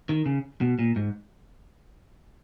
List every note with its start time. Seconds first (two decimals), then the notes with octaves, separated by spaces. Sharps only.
0.09 D#3
0.26 C#3
0.61 B2
0.79 A#2
0.96 G#2